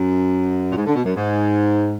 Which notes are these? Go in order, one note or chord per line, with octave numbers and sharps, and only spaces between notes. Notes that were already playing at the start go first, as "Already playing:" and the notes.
Already playing: F#2
A#2
G#2
D3
B2
F#2
G#2